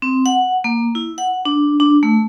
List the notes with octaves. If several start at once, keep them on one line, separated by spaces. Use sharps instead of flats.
C4
F#5
A#3
E4
F#5
D4
D4
A3